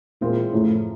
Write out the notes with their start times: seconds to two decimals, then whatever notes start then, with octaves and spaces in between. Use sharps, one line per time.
0.21 A#2 E3 G#3 C4 F4
0.52 F#2 A2 C#3 F3 A3